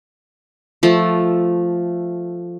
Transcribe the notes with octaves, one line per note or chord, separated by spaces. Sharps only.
F3 A3